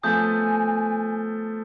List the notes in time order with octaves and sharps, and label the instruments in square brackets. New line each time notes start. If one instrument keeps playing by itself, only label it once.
[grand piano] F3 A3 B3 [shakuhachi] G#5 [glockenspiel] D#6 G6